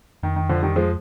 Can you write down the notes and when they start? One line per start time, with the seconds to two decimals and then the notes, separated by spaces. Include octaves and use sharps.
0.23 F2 D#3
0.36 D#3
0.49 D3 F3
0.63 D#3 G3
0.76 F3 G#3